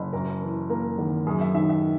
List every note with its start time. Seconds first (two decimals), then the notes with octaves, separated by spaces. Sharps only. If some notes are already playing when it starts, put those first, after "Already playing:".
Already playing: F#1
0.13 F#2 A#4
0.42 E3
0.69 A#3 A#4
0.98 G#1
1.27 F#2 G#4
1.41 E5
1.55 D#3 E5
1.69 E5